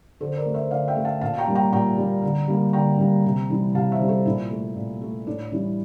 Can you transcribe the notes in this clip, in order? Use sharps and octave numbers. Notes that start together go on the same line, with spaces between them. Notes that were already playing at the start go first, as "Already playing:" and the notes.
D3 A4 C5
A#4 D5
A3
C5 E5
D3 D5 F5
E5 G5
A3
F5 A5
A#2 F5 A5
A5
G5 A#5
G3 A#3
G5 A#5
A#2 G5 A#5
G3 A#3
D3
G3 A#3
D3 G5 A#5
G3 A#3
C3
E3 G3
C3 F5 A5
C5 E5
E3 G3
A4 C5
A#2 E4
A3
A#2
A3
A2 D4
E3 G3 E4